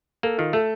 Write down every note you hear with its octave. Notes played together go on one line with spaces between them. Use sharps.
A#3 A4
D#3 F4
A3 A4